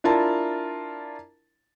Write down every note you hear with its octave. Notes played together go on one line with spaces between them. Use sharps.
D4 E4 F4 A#4 A5